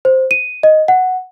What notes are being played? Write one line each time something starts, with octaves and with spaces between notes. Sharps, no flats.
C5
D#7
D#5
F#5